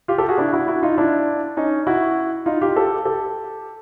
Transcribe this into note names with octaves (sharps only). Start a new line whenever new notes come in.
F4 G4
G4 A4
F#4 G#4
D4 E4
E4 F#4
E4 F#4
D#4 F4
D4 E4
C#4 D#4
E4 F#4
D#4 F4
F4 G4
G4 A4
G4 A4